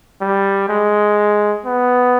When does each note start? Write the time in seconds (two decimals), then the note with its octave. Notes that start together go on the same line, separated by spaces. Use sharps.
0.21 G3
0.69 G#3
1.65 B3